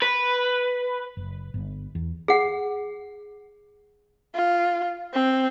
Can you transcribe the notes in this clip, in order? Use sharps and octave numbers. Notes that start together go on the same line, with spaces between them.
B4
F#1
G1
E2
G#4 F#5
F4
C4